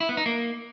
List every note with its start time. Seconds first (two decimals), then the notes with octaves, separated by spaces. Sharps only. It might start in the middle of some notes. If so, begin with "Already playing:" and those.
0.01 E4
0.09 B3
0.17 D#4
0.26 A#3